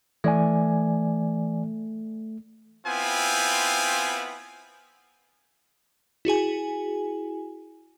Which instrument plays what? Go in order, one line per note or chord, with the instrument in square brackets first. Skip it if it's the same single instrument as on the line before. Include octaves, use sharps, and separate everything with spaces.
[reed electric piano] E3 D5 G#5 [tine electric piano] A3
[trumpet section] B3 C4 E4 F4 G5 G#5
[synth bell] E4 F#4 G#4 G#5